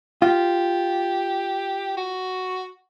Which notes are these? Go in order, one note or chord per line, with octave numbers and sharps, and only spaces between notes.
F4 G4
F#4